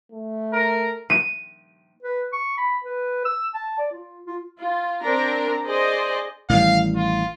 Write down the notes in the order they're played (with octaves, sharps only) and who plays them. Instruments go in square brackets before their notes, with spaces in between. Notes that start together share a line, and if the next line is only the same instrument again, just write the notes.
[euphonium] A3
[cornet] A#4
[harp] D#7
[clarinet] B4
C#6
B5
B4
E6
A5
D5
F4
F4
[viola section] F4
C4 D4 A#4 A#5
G#4 C5 D5 D#5
[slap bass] A1 D#3 G3 [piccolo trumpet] F5
[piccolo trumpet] F4